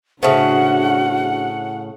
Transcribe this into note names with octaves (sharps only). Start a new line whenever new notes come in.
A2 C#3 D4 F#4 C5 E5 F#5 A5